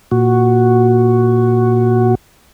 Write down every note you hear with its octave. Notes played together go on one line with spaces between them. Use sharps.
A#2 F#4